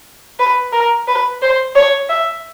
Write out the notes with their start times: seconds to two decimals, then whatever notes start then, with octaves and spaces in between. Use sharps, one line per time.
0.39 B4
0.73 A#4
1.08 B4
1.42 C5
1.76 C#5
2.09 E5